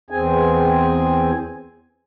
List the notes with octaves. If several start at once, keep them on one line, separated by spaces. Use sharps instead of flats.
E2 C4 G#4 G#5